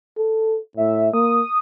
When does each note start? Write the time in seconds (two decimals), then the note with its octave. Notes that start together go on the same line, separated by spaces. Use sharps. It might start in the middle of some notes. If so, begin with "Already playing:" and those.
0.18 A4
0.77 A2 E5
1.14 A#3 D#6